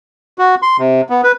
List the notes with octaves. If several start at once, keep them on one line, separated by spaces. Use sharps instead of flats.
F#4
C6
C3
B3
B4